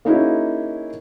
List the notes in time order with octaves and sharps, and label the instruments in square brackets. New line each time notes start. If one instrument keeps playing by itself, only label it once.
[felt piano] A#3 C#4 D#4 E4 F#4 G#4